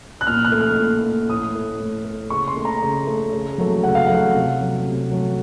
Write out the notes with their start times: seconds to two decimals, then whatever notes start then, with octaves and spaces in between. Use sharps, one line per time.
0.21 F#6
0.27 A#2 F6
0.45 F#6
0.52 A3
0.61 F6
0.78 A#2
1.04 A3
1.29 A2 D#6
1.55 A3
1.80 A2
2.05 A3
2.30 C#3 C#6
2.48 C6
2.56 A3
2.65 A#5
2.82 C#3
3.07 A3
3.33 C#3
3.58 F#3 A3
3.83 C#3 F#5
3.95 F5
4.07 F#3 A3 F#5
4.35 C3
4.60 F#3 A3
4.85 C3
5.11 F#3 A3